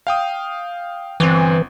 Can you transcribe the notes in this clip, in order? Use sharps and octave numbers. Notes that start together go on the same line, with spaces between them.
F5 G5 D#6
G1 E3 C4